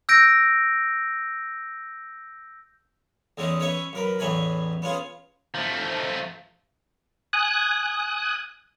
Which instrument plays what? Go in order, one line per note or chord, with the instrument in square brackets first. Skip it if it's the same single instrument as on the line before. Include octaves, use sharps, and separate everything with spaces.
[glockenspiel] E6 G6 A#6 D7
[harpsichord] E2 E3 G#3 C#4 D#4
C#4 B4 C#5 E5 C#6
F#2 A#4 B4
A1 E2 E3 C#5 G#5 B5
B3 C#4 F4 G#4
[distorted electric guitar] F3 A3
[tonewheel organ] G#5 D#6 F#6